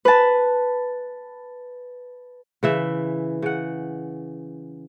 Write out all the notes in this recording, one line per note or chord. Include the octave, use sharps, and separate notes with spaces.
B4 A5
C#3 E3 E5
C#3 F#5